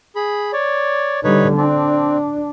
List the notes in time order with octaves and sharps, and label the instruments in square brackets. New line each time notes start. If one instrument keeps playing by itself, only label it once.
[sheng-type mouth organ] G#4 B5
C#5 D5
[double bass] D3 G3 [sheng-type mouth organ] D#4 B4 C#5
[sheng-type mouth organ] C4 [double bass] D4